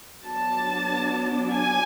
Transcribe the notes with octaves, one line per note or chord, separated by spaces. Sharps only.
F#3 B3 D4 A5
G#5